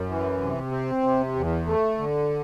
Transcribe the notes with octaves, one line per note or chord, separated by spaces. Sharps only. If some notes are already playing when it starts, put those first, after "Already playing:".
Already playing: F#2
E3
C3
C4
C3
E2
A3
D3